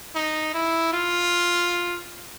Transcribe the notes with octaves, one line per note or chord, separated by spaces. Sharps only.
D#4
E4
F4